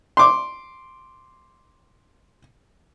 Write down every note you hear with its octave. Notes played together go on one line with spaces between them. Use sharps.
C6 D6